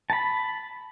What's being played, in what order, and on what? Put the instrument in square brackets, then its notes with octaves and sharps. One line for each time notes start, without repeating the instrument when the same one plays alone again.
[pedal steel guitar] A5 B5